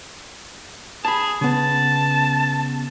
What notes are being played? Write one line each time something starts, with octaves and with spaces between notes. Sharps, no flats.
G#4 A5 B5
C#3 B3 A5